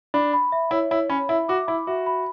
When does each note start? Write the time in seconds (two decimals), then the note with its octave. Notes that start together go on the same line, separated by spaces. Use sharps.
0.14 D4 B5
0.33 B5
0.52 E5
0.71 E4 C#5
0.91 E4 C#5
1.10 C#4 B5
1.29 E4 E5
1.48 F#4 D6
1.67 E4 B5
1.87 F#4 E5
2.06 B5